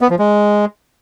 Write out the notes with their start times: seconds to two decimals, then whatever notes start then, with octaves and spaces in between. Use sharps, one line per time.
0.01 B3
0.10 F3
0.19 G#3